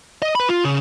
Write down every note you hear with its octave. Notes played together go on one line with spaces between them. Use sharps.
D#5
B4 B5
F4
C#3